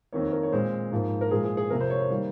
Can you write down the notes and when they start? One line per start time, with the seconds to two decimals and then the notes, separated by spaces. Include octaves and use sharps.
0.13 F2 D#3 A#3 C#5
0.32 A#4
0.43 C#5
0.52 A#2 G#3 C4 C5
0.92 G#2 F3 A#3
1.21 A#4
1.31 A#2 F3 G#3 G#4
1.44 G#4
1.57 G#4
1.70 F2 C3 F3 A#4
1.80 C5
1.90 C#5
2.00 C5
2.10 D#3 G3 A#3